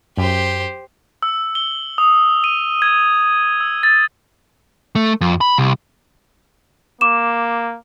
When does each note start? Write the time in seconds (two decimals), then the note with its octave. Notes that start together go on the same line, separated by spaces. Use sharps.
0.17 F#2 G4 C5
1.23 E6
1.55 G7
1.98 D#6
2.44 D#7
2.82 G#6
3.61 E6
3.83 A6
4.95 A3
5.21 F2
5.41 B5
5.58 C2
7.01 A#3 D6 E7